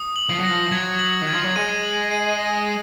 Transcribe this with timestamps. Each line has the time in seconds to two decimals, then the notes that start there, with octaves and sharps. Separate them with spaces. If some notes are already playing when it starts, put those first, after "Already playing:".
Already playing: D#6
0.16 F#7
0.29 F3
0.39 F#3 A#6
0.49 F3
0.71 F#3 G#6
0.99 F#7
1.22 D#3
1.27 G#6
1.33 F3
1.44 F#3
1.56 G#3 D#7
1.83 F#7
2.11 D#7
2.39 A#6